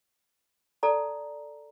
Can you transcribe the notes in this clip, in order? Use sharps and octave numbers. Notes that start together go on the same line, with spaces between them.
A4 D5 A5 A#5